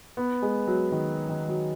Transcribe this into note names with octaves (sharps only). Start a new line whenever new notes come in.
B3
G#3
F#3
D#3
D#3
F#3